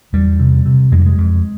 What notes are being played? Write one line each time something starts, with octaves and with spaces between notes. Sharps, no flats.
E2 G3
C3
C3
F2 G#3
G3
G#3
F2